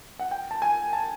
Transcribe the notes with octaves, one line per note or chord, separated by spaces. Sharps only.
F#5
G5
A5
G#5
A5